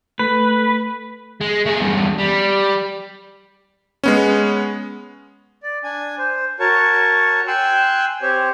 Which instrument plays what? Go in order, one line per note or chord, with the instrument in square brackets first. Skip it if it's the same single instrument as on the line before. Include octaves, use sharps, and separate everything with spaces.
[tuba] A3 [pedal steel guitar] B4
[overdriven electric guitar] G#3
A3 G#4
E2 G2
G3
[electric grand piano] G#3 B3 C#4
[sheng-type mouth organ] D5
D4 G#5
C5
F#4 A#4 C#5 A5 C#6
G5 G#5 C6 E6 F#6
C4 G4 C5 C#5